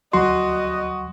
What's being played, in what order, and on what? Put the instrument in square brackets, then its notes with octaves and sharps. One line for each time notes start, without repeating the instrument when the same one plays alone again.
[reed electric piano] D2 F#3 C6 [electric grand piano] F#4 [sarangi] D#5